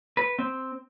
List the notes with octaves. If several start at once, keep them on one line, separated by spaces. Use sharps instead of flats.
B4
C4